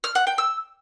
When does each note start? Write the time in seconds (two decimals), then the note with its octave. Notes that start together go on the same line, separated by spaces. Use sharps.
0.04 F6
0.15 F#5
0.27 G5
0.38 E6